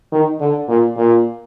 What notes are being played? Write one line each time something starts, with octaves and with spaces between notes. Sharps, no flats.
D#3
D3
A#2
A#2